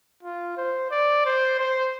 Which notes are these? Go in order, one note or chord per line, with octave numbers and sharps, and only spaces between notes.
F4
C5
D5
C5
C5